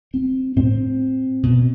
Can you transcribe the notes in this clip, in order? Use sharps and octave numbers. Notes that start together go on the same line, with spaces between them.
C4
A2 C4
B2